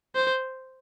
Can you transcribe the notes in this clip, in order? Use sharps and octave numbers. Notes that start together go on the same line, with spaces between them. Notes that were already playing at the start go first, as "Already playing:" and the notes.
C5